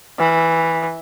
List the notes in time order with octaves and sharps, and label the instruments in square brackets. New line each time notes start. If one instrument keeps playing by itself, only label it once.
[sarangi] E3